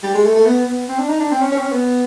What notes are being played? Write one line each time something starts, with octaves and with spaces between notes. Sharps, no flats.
G3
G#3
A3
A3
B3
B3
C4
D4
D#4
D4
C4
C#4
C#4
C4
C#4
B3